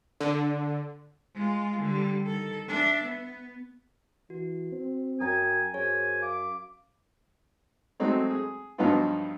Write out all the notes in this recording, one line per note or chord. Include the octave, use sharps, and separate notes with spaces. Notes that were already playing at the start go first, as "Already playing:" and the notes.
D3
G#3 F4
D3 G3
D#3 A4
D4 E5
B3
E3 F#4
C4
F#2 G5 G#5 A#5 D#6
F#2 G#4 C5 C#5 G#5
F5 D6
F#3 G#3 A3 C4 D#4
G#4
G2 F3 F#3 B3 D#4 F4